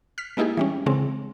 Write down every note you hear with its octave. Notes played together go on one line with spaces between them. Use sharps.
F6 B6
G#3 A#3 D#4 E4 G4 G#4
E3 G3 C#4
C#3 E3 G#3 C4